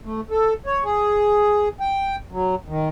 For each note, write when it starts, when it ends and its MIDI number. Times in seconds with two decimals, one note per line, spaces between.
0.05 0.21 57
0.31 0.54 69
0.66 0.84 73
0.84 1.69 68
1.80 2.16 79
2.32 2.55 54
2.68 2.89 51